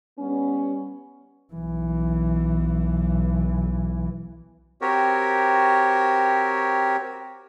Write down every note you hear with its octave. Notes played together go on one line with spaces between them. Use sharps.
G3 B3 C#4
B1 E3
C4 F#4 G4 A#4 C#5